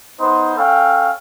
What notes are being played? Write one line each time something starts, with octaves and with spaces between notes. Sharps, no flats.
B3 D#4 C5
C#4 A4 F5 G5